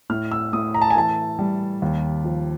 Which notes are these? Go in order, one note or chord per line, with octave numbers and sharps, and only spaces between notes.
A2 F6
E6
A2 D#6
A#5
A5
G#5
E3 A5
G3
D#2
F3